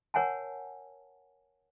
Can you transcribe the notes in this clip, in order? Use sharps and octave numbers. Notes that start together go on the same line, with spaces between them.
A#4 C#5 F#5 G#5 A5